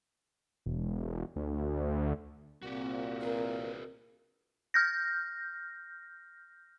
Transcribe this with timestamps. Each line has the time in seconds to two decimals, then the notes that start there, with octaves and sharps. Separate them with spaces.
0.66 E1
1.36 D2
2.63 C2 A#2 C4 F#4 G4
3.21 F#4 G#4 A#4 B4
4.74 F6 G6 A#6